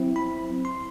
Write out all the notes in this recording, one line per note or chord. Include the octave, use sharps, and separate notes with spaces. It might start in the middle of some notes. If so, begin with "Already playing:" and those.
Already playing: F#3 C4 E4
B5
C6